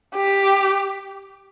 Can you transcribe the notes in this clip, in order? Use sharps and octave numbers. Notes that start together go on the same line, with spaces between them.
G4